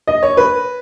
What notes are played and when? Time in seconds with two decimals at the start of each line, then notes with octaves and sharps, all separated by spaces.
0.07 D#5
0.23 C#5
0.37 B4